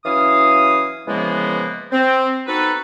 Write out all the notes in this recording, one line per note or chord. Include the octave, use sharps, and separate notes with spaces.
E3 F#3 C#4 E4 F5 D#6
C#3 E3 F3 G#3 A#3 B3
C4
B3 C4 D#4 F#4 A4 B4